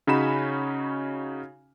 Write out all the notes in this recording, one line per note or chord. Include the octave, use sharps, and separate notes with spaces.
C#3 C#4 D#4 F#4 B5 E7